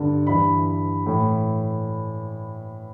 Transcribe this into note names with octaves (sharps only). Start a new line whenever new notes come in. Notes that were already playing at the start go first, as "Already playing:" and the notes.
Already playing: G2 D3
G2 E3 B5
A2 E3